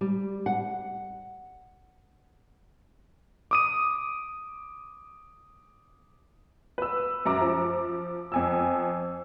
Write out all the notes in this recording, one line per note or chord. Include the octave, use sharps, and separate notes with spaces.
G3
F#5
D6 D#6 D#7
B4 E6
F#2 A#5 D6
F3
F2 G#5 E6